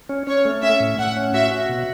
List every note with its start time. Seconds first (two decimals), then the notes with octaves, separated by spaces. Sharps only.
0.09 C#4
0.27 C#4 C#5
0.45 A3
0.63 C#4 E5
0.80 A2
0.98 A2 F#5
1.17 C#4
1.34 F#4 E5
1.51 F#4
1.69 B2